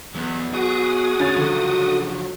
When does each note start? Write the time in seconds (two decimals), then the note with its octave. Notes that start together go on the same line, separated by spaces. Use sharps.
0.15 E2 F#3 B3
0.53 F#4 G#4 D#6
1.20 D2 C#4 A6
1.36 C#2 D3 F3 F#3